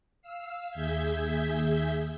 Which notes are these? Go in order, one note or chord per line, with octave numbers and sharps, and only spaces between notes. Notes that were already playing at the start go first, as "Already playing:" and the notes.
F5 E6
D#2 G#4 E5 G6 G#6 B6